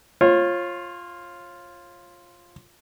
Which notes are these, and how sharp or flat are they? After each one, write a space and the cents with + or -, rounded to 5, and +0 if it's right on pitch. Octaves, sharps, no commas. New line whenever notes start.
F4 +0 C#5 -35